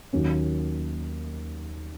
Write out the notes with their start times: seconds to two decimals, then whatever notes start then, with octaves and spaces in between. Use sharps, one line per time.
0.13 D#2 D#3 F#3 A#3 C#4